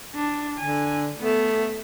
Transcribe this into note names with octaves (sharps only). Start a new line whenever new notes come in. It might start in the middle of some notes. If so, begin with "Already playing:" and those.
D4
D3 G#5
A3 B3